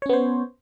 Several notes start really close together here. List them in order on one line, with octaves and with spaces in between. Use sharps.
C#5 C#4 B3 C5